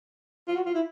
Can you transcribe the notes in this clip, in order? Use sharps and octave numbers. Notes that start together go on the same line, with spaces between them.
F4
F#4
F4
E4